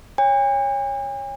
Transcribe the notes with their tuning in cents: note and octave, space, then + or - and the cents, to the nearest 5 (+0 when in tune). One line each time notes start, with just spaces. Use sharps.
C#5 +0 G#5 -45